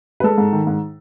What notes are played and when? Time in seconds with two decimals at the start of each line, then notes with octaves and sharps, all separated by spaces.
0.20 B4
0.24 G#3 A4
0.38 G#2
0.53 D#3
0.67 G#2